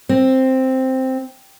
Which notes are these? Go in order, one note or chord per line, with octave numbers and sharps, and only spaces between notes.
C4